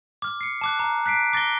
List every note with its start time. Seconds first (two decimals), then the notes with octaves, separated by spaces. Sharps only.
0.22 D6 F6
0.41 C7 C#7
0.61 A5 D6 F#6
0.79 A#5
1.06 F#6 B6 C7 D7
1.33 D6 A6 A#6 G7